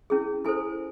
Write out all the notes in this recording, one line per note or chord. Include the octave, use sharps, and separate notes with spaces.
C#4 E4 G#4
E4 A4 C5 G#5